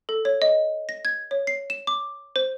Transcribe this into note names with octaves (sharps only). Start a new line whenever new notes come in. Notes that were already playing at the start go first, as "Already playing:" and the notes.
A4
C#5
D#5
A#6
G#6
C#5
C7
E7
D6
C5